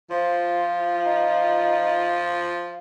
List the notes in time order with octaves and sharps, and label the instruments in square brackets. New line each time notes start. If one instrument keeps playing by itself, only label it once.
[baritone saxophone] F3 [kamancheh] F4 [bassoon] C5
[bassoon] D#4